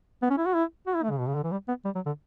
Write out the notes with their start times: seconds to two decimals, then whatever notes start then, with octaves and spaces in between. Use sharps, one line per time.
0.22 B3
0.30 C#4
0.37 E4
0.46 F#4
0.54 E4
0.87 F#4
0.95 E4
1.03 A3
1.11 C#3
1.19 B2
1.27 C#3
1.35 D3
1.44 E3
1.51 G3
1.68 B3
1.85 G3
1.95 F#3
2.06 D3